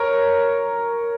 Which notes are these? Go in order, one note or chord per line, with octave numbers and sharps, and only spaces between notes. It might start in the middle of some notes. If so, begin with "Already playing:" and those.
Already playing: A#4 C#5